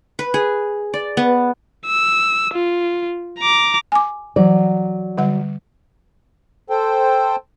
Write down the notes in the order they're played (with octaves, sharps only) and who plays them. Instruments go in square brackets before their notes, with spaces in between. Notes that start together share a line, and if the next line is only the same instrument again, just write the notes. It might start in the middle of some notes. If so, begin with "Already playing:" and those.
[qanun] B4
G#4
D5
B3
[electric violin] E6
F4
A#5 D6
[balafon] G#5 D6
[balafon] E3 [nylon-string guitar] F#3 D5
[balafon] D3 G3 F#5
[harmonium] A4 C5 G5